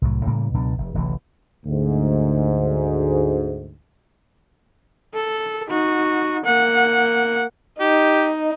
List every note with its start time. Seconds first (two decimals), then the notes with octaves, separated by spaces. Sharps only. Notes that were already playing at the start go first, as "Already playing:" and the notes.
0.02 C2 A2 F#3
0.26 A2 C#3 G3 A#3
0.54 C#2 B2 F#3 D4
0.78 F1
0.94 D1 A1 C3 E3
1.66 D2 G#2
5.14 A4
5.68 D#4 F#4
6.44 A#3 F#5
7.80 D#4 G4